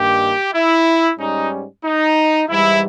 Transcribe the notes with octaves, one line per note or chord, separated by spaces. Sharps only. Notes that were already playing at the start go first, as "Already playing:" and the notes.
Already playing: G2 D#3 G3 A#3 G4
E4
G#2 G3 C#4 D#4
D#4
G#2 E3 G3 E4